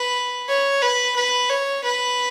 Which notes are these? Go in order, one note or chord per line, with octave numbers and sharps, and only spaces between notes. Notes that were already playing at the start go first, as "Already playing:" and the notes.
Already playing: B4
C#5
B4
B4
C#5
B4